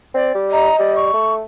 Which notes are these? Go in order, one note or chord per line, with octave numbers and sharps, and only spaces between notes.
C4 D5
G3
D#5 A#5
G3 D5
C#6
A3